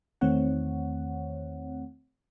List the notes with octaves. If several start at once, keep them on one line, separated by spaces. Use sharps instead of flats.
E2 D#3 A3 C4 C#5 F#5